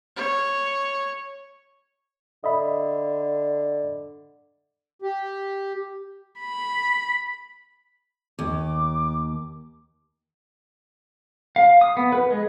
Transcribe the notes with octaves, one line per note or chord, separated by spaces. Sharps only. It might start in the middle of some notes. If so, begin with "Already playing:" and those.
C#5
D3 D#5 E5 B5
G4
B5
D#2 D6
F5
D#6
B3
B4
G#3